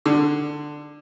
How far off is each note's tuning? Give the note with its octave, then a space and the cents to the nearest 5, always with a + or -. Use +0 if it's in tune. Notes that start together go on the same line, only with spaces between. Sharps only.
D3 +15